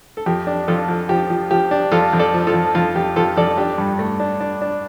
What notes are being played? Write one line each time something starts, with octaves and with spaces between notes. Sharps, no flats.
A4
F2 G4
D4
F2 F4 A4
F2
F3 G4
F3
F3 G4
D4
F2 F4 A4
F2
A4 D5
F3
F4 A4
F2
F2 F4
F2 G4
F2 F4 A4
F2 A4 D5
D4 G4
G2
A3
D4
D4
D4